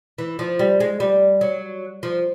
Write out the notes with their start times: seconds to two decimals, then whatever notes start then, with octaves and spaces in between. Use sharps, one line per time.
0.18 E3
0.39 F3
0.59 G3
0.80 G#3
1.00 G3
1.41 F#3
2.03 F3